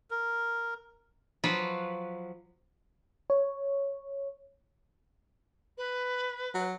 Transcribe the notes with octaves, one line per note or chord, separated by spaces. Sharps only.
A#4
F3 F#3 F4 B4
C#5
B4
F#3